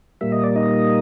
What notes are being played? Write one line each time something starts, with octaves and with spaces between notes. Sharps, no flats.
A#2 G3 A#3 E5
D#5
D5
D#4 D#5